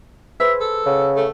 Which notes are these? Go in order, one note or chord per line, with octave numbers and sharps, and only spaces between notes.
G#4 B4 C5 E5
A4
C#3 F#5
A3